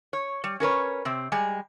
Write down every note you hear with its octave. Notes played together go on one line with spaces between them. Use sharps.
C#5
G3
C#4 A#4 B4 C#5
C3 C4
G3 G#3 G#5